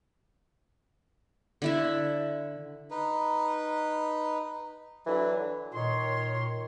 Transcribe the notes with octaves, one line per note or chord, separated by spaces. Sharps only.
D3 E4 E5
D#4 B4
D3 E3 F#3
A#2 D#3 C#5 C6